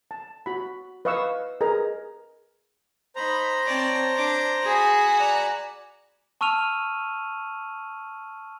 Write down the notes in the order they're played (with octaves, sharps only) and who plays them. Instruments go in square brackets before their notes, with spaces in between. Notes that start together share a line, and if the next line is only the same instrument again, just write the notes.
[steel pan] A5
F#4 B5
B4 D#5 F5 C#6 D#6 E6
G#4 A#4 B4 D#5 A#5
[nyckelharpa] D#4 B5 [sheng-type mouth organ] C5 A#5
[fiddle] C4 D5 [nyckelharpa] C#5 A5
[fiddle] D4 D6
[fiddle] F#4 B5 [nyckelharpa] G#4 [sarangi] G#5
[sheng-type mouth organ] D5 F#6 [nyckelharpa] A#5
[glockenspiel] A5 C#6 E6 F6 D#7 F7